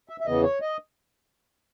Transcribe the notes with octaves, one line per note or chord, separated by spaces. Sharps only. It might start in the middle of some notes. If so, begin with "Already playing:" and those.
E5
E5
E2 C#3 E3 B3 D#5
C#5
D#5